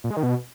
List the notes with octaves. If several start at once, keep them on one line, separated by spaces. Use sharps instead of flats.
A#2
G#3
D#3
B2